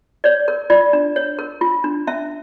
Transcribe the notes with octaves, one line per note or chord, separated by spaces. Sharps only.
C#5 D5
A#4
F4 D5
D4
C#5
A#4
F4
D4
C#4 E5